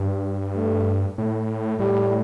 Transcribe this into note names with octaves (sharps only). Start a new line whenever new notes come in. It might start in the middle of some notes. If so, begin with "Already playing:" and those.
Already playing: G2
A3
A2
A2 G3